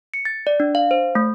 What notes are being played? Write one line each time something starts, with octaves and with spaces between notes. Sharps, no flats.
C#7
A6
D5
D4
F5
C5
A3